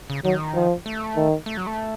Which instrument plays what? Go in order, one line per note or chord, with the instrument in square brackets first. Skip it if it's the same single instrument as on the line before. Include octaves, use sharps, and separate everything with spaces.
[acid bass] C#3
[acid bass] D#3 [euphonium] F#3
[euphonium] F3
[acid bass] A3
[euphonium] D#3
[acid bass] A3
F#3
A3